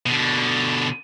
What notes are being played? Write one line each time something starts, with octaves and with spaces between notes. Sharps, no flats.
B2 D3